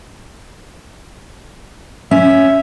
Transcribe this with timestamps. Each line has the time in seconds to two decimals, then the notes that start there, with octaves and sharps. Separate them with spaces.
2.11 C#4 E5